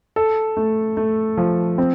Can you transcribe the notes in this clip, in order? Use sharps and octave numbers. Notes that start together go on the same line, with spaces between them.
A4
A3
A3
F3
C4